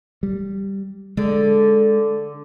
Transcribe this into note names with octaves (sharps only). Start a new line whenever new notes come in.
G3
D3 G#3